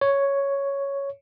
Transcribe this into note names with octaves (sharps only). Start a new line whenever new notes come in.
C#5